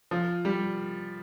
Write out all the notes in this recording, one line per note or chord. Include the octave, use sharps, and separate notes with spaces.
F3
G3